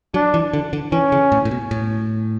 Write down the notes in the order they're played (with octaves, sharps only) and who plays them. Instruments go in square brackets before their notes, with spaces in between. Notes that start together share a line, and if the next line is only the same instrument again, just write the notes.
[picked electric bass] F#3 [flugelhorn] D4
[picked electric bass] E3
D3
D3
[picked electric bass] E3 [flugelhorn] C#4
[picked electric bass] C#3
A2
A2
B2
A2